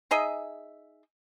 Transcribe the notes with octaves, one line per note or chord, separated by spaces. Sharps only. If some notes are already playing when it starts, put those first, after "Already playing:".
D#4 G#4 D#5 E5